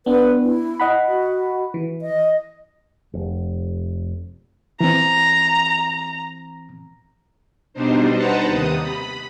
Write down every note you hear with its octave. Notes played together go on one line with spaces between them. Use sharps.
B3 D4 B4
E4
D#5 F#5 B5
F#4
E3
D#5
F1
E3 C4 A#5
B2 G3 D4 D#4 C5
B4 C5 F#5 A5 A#5
D#2 C3 D#6
B5